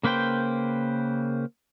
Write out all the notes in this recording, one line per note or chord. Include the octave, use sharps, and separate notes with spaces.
C#3 A#3 B4 C5 G5